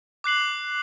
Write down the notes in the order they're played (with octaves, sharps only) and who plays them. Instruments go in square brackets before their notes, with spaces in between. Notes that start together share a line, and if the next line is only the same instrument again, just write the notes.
[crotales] D6 F#6 C7 F#7